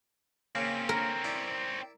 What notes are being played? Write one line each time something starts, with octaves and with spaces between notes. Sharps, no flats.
C#3 A#3 C4 C#4
A#4
E4 D5